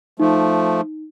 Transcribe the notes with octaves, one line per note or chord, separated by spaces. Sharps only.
F3 A3 D#4